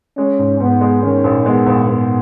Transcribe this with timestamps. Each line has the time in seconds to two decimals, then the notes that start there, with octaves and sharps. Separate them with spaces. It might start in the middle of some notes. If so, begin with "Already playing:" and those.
0.17 G#3 C#4
0.39 G#2
0.60 G#2 B3
0.81 G#3
1.03 D#3 C#4
1.24 A#1
1.46 G#3 B3
1.66 A#1
1.88 A#1 B3